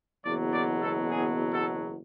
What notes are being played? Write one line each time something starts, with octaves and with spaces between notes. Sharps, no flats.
F#1 E2 B2 F#3 D5
D5
A4
G#4
A4